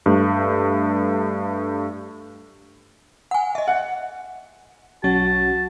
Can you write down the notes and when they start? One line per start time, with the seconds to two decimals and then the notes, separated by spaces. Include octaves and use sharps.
0.06 G2 A3
3.31 F#5 G#5
3.55 D#5 E5
3.68 F#5
5.04 B1 F#3 C#4 F#4 A5